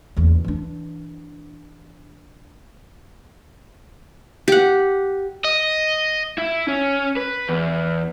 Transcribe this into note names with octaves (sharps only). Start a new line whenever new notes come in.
F#1 E2
E3 D4
G4 F#5
D#5
E4
C#4
B4
E2